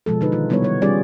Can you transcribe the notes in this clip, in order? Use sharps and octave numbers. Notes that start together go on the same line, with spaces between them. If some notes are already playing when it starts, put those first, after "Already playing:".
B2 F3 G#3 A4
D3 D#4 B4
D#3 F4
C3 G3 B3 E4 B4 C#5
E3 G3 C#5
G3 C#4 F4 G4 G#4 D5